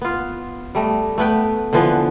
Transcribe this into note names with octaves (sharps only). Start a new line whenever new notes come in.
B3 F4
G3 A3 D#5
A3 B3 B4 G5
D3 E3 F3 B3